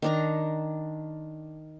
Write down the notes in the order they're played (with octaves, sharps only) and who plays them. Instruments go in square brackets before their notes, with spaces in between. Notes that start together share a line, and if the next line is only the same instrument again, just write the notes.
[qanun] D#3 D4 A#5